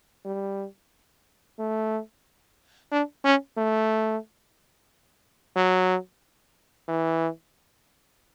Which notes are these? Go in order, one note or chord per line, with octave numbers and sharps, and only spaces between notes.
G3
A3
D4
C#4
A3
F#3
E3